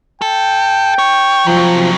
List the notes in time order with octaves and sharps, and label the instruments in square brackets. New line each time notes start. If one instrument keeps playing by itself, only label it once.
[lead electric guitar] A4 [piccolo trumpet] G5
[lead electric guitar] C#5
[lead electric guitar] C3 F#3 [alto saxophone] F3